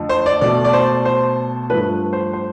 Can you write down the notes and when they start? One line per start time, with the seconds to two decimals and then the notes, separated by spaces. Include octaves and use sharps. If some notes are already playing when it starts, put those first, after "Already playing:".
Already playing: F2 D3 F3 A3
0.09 C5
0.26 D5
0.41 B2 A3 D5
0.64 D5
0.73 C5
1.05 C5
1.70 G2 F3 A3 B4
2.13 C5
2.33 C5